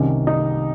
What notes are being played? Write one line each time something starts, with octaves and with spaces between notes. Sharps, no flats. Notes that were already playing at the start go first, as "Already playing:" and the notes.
Already playing: C2 C3 D#3 C#4
D#4